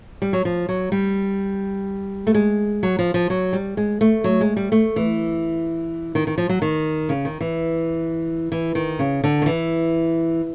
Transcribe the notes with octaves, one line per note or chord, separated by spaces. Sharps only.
G3
F#3
F3
F#3
G3
A3
G#3
F#3
F3
F3
F#3
G3
G#3
A3
F#3
G#3
G3
A3
E3
D#3
D#3
F3
F#3
D#3
C#3
D#3
E3
E3
D#3
C#3
D3
D#3
E3